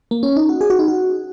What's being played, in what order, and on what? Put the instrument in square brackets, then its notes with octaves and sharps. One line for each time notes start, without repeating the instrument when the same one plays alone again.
[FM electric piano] A#3
C#4
D#4
F#4
G#4
F#4
D#4
F#4